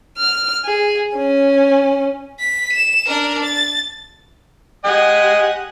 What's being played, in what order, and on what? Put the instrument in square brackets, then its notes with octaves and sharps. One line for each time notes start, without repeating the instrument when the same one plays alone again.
[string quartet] F6
G#4
C#4
[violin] B6
E7
D4 A#4
A6
[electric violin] G4 F#5 [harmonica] D#5 G#5